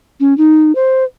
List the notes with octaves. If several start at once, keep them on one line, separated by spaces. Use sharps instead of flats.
C#4
D#4
C5